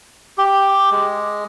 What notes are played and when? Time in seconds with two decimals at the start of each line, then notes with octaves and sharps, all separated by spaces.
0.38 G4
0.91 G#3